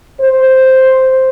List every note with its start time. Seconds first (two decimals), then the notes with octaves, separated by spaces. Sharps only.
0.19 C5